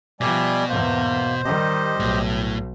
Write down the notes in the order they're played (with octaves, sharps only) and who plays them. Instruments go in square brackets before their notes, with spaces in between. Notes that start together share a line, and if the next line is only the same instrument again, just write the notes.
[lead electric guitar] B2 [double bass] F3 [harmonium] G3 D5 G#5 [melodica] E5 D6
[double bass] E2 G#2 [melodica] A#3 [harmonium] C5
[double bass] D#3 G3 [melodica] G4 D#5
[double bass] B1 [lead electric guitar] A2